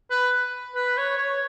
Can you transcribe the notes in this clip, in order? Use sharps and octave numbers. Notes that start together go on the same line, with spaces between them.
B4
B4
C#5
C#5